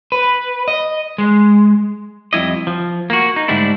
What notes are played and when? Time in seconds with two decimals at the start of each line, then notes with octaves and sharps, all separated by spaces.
0.12 B4
0.68 D#5
1.18 G#3
2.33 F2 G3 E4 D#5
2.67 F3
3.10 A#3 F#4
3.36 D#4
3.48 G#2 D3 G3 A3 D4 E4